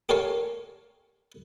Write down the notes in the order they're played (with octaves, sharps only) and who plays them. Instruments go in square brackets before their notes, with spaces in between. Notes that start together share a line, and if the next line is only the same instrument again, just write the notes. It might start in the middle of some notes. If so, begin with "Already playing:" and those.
[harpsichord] G4 A4 A#4 C#5 F5 G#5